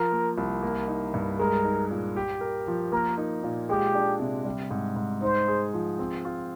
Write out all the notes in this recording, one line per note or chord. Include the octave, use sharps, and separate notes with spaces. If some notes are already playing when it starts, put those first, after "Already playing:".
Already playing: F3 A#4
A#3
C2
A#3
D#4
G2
G#3 A#4
D#4
A#2
G4
A#4
F3
A#3 A#4
D#4
A#2
G#3 G4
D4
C3
G3
G#2
G#2
D#4 C5
G#4
F3
C4
F4